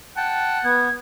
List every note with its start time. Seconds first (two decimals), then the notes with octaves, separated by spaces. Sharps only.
0.17 F#5 G5 A5
0.64 B3 G#6